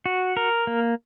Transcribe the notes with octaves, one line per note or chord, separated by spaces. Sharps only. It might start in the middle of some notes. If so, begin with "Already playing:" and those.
F#4
A#4
A#3